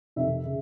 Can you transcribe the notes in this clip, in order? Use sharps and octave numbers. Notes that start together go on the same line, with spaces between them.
F2 C3 D#3 E5
C#3